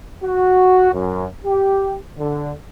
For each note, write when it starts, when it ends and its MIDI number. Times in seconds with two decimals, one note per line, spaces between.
0.22 0.91 66
0.92 1.25 42
1.45 1.96 67
2.18 2.51 50